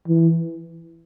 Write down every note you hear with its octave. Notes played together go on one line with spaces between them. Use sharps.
E3